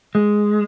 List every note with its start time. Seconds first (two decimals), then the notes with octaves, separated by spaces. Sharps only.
0.15 G#3